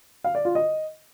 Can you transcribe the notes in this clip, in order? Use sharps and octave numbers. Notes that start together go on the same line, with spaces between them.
F5
D5
F4
D#5